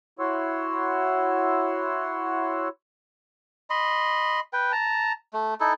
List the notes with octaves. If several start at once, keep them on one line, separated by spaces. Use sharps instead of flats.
E4 F#4 C#5 F#5 C6 E6
D#5 B5 C6
B4 G5
A5 A#5
A3
D#4 E4 A4